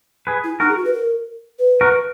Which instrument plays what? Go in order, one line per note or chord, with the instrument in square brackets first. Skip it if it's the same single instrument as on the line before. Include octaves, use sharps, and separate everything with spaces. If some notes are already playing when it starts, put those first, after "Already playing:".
[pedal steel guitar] G#4 B4
[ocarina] E4
[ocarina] D#4 [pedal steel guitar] F#4 A#4
[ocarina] G#4
F#4
B4
A#4
B4
[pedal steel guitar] F#4 A#4